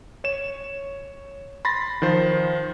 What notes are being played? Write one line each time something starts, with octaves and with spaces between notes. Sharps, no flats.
C#5 E7
B5 C6 A6 A#6
D#3 F3 C5